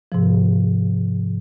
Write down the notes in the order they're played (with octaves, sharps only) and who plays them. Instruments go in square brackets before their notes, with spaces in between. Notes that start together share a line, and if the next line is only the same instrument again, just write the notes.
[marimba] G#2 C3 F3